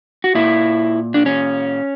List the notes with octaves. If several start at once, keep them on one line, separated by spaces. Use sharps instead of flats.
F#4
A#2 E4
D4
C#4